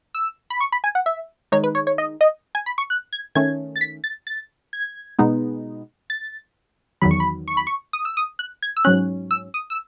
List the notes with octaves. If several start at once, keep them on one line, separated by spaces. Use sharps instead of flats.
E6
B5
C#6
B5
G#5
F#5
E5
D#3 G#3 D#4 C#5
B4
C#5
C#5
D#5
D#5
G#5
B5
C#6
F#6
G#6
D#3 A3 C#4 G#6
A6
B6
A6
A6
G#6
B2 G#3 B3 D#4
A6
E2 D#3 F#3 B5
C#6
B5
C#6
B5
C#6
D#6
E6
D#6
F#6
G#6
E6
G#2 F#3 C#4 F#6
E6
D#6
E6